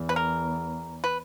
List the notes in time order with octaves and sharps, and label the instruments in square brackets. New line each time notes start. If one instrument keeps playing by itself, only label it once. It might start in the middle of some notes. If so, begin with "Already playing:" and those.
Already playing: [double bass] E2
[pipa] B4
A#4
B4